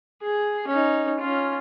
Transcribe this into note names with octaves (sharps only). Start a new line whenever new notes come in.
G#4
C#4 D#4
C#4 F4